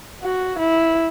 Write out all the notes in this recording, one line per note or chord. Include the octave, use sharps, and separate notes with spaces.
F#4
E4